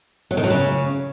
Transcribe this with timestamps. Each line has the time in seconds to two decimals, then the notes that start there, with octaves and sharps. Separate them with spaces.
0.31 F#3
0.37 D#3
0.44 F#3
0.50 C#3